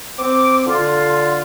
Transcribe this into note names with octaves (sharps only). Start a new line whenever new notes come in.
C4 D6
D3 F4